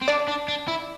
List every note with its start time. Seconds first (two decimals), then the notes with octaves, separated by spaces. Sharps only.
0.01 C4
0.08 D4 D5
0.28 D4
0.48 D4
0.68 E4